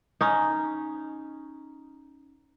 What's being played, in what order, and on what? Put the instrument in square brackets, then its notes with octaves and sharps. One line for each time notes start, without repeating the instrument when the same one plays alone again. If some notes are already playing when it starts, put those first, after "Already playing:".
[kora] C#4 D#4